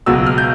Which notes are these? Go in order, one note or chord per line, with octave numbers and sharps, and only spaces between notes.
C#2 B2 F#3 E6
F6
G6